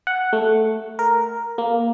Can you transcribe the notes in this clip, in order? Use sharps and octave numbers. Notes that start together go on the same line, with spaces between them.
F#5
A3
A#4
A#3